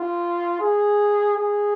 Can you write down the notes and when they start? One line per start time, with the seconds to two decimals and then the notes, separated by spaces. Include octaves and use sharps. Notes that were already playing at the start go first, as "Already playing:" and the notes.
Already playing: F4
0.60 G#4
1.37 G#4